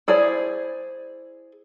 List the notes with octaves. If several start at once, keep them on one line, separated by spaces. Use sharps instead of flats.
E4 G#4 C5 D5